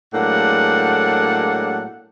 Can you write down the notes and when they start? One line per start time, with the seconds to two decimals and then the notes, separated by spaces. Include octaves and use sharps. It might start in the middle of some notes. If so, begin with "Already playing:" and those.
0.14 A2 F#3 G#3 A#3 D4 F#5